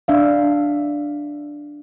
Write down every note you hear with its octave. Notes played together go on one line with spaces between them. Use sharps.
D4 E5 F5